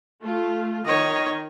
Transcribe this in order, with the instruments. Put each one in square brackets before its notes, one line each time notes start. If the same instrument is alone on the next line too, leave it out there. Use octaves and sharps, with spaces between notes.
[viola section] A3 F4
[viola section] D#3 [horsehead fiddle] C#5 D#5